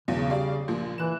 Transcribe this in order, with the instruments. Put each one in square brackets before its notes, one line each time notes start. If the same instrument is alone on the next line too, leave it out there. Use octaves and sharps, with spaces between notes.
[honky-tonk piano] B1 E2 [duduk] C#3
[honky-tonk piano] G3 D5 F5
A#1 A#2 F3
[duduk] E3 [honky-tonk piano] F#6 E7